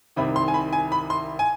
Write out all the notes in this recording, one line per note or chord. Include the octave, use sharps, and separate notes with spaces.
C2 C3 D#3 B5
C6
G#5
B5
G#5
B5
C6
G#5